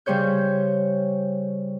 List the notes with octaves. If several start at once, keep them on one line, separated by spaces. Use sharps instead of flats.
C#3 G3 C5 C#5 G6